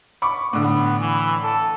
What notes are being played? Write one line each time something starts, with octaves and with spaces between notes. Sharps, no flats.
B5 C#6 D6
A2 D3 B3
E3
A4